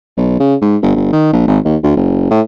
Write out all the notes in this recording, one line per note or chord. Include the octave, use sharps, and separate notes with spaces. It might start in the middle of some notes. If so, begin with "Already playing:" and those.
B1
C#3
G#2
G1
G1
D#3
A#1
G#1
D#2
D2
F#1
A2